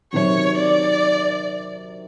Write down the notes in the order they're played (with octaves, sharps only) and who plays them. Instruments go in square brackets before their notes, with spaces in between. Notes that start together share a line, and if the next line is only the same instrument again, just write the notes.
[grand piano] C3 D#3 F#3 [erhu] C#5
[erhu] D5